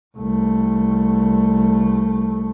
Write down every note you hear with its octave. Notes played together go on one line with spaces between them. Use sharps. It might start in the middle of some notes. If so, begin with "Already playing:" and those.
C2 A3